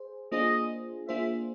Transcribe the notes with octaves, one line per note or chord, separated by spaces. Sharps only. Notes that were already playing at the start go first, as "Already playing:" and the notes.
Already playing: G#4 C5
A#3 D4 F4 G#4 C5 D#5
A#3 D4 F4 G#4 C5 E5